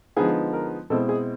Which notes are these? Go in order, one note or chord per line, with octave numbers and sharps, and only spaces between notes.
D3 F3 G#3 B3 D#4 G#4
A#4
B2 G#3 C4 E4 A4
G#4